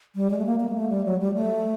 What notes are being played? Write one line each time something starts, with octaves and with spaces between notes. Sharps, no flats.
G3
G#3
A3
A#3
A#3
G#3
A3
G3
F#3
G3
A3